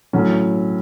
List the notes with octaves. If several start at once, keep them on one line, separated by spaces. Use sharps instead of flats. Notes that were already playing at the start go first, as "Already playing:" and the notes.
A2 F#3 C#4